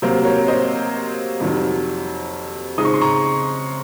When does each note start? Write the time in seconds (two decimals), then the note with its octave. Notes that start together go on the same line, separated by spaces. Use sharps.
0.02 C3 F#3 A#3 C5
0.25 A#4 C#5
0.48 C5 D#5
1.40 F2 C3 D#3 F#3
2.78 C#3 G#3 C4 D#4 D#6
2.85 C#6
2.94 C6
3.01 A#5 C#6